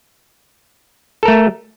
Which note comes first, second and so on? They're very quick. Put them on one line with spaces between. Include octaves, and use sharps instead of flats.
A4 A#4 A3